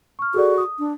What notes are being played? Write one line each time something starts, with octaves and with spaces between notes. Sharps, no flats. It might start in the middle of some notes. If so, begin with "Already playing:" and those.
C#6 F6
F#4 G#4 A4 D5
D#6
D4